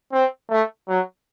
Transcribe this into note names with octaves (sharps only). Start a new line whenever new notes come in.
C4
A3
F#3